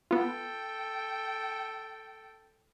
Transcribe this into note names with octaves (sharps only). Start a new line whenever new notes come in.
B3 F4 A4 G5